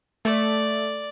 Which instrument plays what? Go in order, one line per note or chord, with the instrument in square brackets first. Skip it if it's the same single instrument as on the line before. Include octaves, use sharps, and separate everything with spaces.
[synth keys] A3 [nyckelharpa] D5